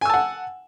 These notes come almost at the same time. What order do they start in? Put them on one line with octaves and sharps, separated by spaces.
G#5 E6 A5 F#5